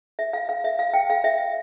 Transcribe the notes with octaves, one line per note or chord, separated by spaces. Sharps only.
E5
F5
F5
E5
F5
G5
F5
E5